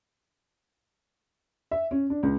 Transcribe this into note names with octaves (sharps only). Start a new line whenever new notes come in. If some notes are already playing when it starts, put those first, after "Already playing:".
E5
C#4
D4
C#2